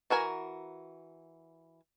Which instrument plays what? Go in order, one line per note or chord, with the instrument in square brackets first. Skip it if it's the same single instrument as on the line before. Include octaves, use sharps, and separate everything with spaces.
[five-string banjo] E3 F#4 A#4 G#5